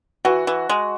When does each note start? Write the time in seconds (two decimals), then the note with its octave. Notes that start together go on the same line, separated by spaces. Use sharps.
0.25 E3 F#4
0.47 E3
0.69 G#3